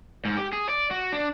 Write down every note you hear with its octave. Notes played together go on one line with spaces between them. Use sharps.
G#2
G4
G#4
D5
F#4
D4